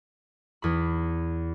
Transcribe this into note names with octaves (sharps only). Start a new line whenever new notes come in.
E2 B5